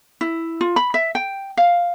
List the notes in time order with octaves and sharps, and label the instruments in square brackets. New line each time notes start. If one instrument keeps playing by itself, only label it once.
[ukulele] E4
F4
B5
E5
G5
F5